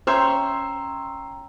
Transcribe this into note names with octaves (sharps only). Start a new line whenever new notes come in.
C#4 C5 C#5 E5 G5 A#5 C6 E6